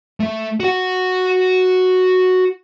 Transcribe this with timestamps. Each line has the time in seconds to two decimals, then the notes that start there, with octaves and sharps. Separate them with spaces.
0.20 A3
0.60 F#4 F#5